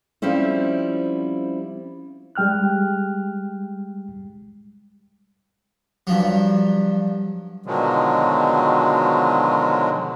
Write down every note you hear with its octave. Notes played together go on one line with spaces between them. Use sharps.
F3 G3 C4 C#4 E4
G3 G#3 G5 F6 F#6
G2 F3 F#3
B2 D3 D#3 F3 F#3 G#3